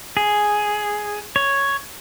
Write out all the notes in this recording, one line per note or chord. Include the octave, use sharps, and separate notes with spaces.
G#4
C#5